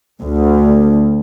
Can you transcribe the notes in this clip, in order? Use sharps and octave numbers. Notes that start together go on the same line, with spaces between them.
D2